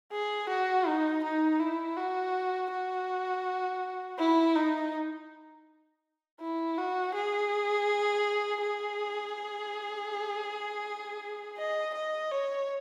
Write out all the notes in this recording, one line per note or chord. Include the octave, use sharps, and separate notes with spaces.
G#4
F#4
D#4
D#4
E4
F#4
F#4
E4
D#4
E4
F#4
G#4
G#4
D#5
D#5
C#5